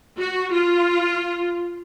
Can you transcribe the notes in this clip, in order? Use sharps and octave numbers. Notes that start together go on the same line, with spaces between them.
F#4
F4